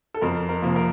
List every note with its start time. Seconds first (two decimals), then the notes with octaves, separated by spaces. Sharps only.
0.14 A4
0.21 F2 A#4
0.49 A#4
0.62 C3 F3 A#3
0.76 A#4